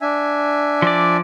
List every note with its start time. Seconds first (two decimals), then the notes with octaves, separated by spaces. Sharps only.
0.01 D4 E5 G#5
0.82 F3 D5